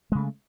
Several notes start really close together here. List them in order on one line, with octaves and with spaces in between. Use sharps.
G#3 C#3 A3